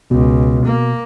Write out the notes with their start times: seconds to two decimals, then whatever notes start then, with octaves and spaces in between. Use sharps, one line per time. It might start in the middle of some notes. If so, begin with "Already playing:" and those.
0.11 C#2 B2
0.65 A#3